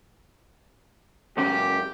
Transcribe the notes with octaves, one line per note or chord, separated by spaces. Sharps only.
C#2 F#2 C#3 G4